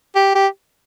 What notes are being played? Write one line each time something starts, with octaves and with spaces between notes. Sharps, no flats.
G4
G4